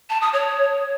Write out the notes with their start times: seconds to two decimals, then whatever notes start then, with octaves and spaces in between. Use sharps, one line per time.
0.10 A5
0.22 D#6
0.33 C#5